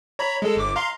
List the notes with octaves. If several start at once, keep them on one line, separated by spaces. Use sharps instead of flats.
C#5 A#5 B5
G#3 A4
G1 D6
F5 A#5 C6